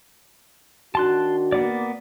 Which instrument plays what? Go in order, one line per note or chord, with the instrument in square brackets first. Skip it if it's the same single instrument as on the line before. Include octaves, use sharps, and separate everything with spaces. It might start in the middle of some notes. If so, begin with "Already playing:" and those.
[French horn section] D#3 D4 F#4 [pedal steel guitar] A5 C6 F#6
[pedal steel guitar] A#3 B3 D5